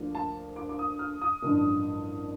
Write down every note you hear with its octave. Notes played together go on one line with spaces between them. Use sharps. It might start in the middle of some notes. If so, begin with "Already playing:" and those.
Already playing: D2 D3 F3 A#3
A5
D6
D6
D#6
F6
D#6
A1 G2 D3 F3 A#3